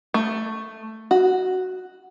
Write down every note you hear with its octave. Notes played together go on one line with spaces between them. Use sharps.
A3
F#4